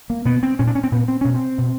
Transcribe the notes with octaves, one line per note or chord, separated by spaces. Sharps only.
A#3
B2 B3
C4
A#2 C#4
D4
C#4
C4
A#2 B3
C4
B2 C#4
C4
B2